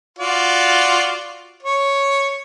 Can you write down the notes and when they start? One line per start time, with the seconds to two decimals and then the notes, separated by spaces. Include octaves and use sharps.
0.19 F4 F#4 D5
1.63 C#5